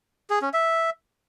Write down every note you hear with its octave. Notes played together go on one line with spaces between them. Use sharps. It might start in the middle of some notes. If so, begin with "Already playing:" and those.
G#4
C#4
E5